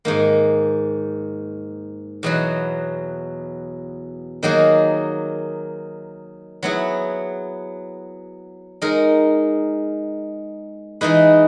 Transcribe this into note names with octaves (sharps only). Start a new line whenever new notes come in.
G#2 D#3 A#3
E2 B2 F#3
D#3 F#3 A#3 D#4 G#4
F#3 B3 E4 G#4
G#3 D#4 A#4
E3 G#3 D#4 G#4 B4